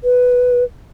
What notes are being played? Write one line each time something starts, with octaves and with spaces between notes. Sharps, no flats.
B4